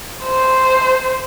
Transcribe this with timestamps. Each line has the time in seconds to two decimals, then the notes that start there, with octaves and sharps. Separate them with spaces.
0.25 C5